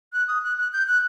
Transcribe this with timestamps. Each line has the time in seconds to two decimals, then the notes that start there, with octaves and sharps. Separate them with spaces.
0.13 F#6
0.28 D#6
0.43 F#6
0.58 F#6
0.73 G6
0.87 F#6